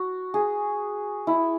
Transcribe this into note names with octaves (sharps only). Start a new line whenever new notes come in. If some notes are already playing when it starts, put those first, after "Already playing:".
Already playing: F#4
G#4
E4